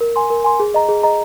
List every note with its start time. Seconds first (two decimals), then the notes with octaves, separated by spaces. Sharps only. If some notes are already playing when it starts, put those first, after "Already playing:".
0.01 A#4
0.16 G#5 C6
0.30 A#4
0.44 G#5 C6
0.60 G#4
0.74 D#5 A#5
0.89 G#4
1.03 D#5 A#5